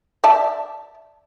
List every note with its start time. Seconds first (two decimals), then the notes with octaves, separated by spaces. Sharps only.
0.24 D5 E5 A5